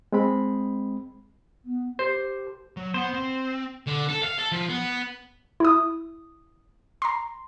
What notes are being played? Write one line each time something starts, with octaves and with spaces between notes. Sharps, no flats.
G#3 C4 B5
B3
G4 C5
F#3
B3 C5 F#5
C4
D3
A4
F5
A4
F3
B3
E4 D#6
A#5 C6